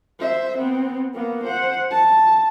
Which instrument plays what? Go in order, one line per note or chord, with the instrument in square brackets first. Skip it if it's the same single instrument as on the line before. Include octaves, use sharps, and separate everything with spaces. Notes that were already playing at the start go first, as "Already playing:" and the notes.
[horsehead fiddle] C5 E5
B3 C4
A#3 B3
C5 F#5
A5